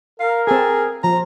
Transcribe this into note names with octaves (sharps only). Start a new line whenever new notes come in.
A#4 F5
C4 G#4 A4
F3 A#5